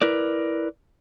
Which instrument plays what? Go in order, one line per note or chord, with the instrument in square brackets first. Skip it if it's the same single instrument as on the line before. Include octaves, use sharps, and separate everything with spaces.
[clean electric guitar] E4 A#4 B4 D5